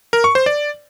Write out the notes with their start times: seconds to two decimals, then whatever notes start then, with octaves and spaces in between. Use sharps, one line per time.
0.13 A#4
0.24 C#6
0.35 C5
0.46 D5